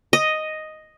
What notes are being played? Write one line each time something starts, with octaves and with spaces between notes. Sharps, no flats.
D#5